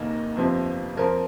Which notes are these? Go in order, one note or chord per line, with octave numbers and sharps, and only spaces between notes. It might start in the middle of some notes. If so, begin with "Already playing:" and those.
Already playing: F1 D#2 D#3 A#3 D#5
G1 F2 C3 F3 C4
F2 F3 C4 A#4